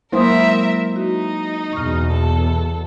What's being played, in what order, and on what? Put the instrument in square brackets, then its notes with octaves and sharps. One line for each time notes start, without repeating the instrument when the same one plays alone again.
[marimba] F#3 G#3 D#6 [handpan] A#3 E4 C5 [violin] A#4 E5
[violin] D#4 [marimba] F#4
[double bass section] E2 B2 [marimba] C#6 F6
[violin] A4 [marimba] A5